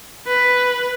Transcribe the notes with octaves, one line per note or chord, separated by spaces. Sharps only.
B4